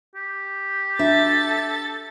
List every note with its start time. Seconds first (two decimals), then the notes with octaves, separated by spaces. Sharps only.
0.15 G4
0.99 D4 A4 E5 A6